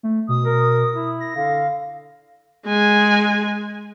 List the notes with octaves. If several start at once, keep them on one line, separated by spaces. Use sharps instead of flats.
A3
B2 D#6
A#4
E4
A#6
D3 F5
G#3 G#5